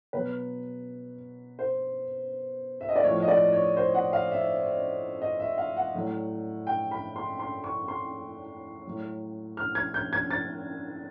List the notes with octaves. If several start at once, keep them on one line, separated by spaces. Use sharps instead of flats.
B2 F#3 B4
C5
E5
D#5
D5
A2 F3 C#5
D#5
D5
C#5
C5
F#5
F5
E5
D#5
E5
F5
F#5
A2 F#3
G5
B5
C6
C6
C#6
C6
A2 F#3
F6
G#6
G6
G#6
A6